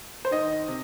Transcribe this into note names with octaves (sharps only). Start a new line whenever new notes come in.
C5
D#3 D#5
C3